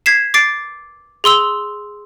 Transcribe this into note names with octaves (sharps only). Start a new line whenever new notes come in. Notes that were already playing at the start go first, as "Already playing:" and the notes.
G#6 B6 C7 E7
D6 A6 C7 D7
G#4 C6 E6 G7